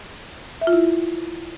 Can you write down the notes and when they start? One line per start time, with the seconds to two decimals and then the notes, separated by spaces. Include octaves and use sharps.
0.61 E5
0.67 F4
0.73 E4